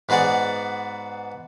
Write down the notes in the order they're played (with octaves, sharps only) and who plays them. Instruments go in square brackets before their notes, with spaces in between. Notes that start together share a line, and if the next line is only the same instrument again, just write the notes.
[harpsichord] G#2 B3 F#4 G#4 D5